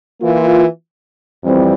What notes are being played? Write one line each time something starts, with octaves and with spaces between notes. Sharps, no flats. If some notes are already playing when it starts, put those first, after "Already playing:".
E3 A#3 F4
F2 E3 G3 C4